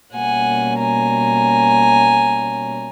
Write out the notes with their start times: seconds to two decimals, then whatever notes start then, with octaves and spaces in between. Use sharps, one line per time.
0.14 B2 G3 A#3 C#4 F#5 G#5
0.78 G#5 A#5